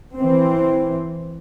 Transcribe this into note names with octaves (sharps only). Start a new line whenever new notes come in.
E3 C4